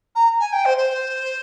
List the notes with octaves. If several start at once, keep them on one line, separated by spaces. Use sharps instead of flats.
A#5
G#5
G5
C5
C5